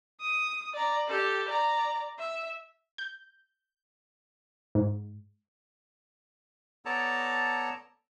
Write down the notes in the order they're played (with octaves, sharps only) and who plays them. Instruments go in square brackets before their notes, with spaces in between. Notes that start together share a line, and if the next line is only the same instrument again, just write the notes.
[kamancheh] D#6
D5 A#5
G4 A4
D5 A#5
E5
[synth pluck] G6
G#2
[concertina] B3 A4 C#5 D5 A5 A#5